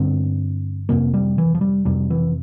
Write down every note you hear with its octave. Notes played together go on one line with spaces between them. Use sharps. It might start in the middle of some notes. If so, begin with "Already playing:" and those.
Already playing: G2 D3 C4
F2 C3 A#3
G3
E3
F3
G3
F2 C3 G3
E3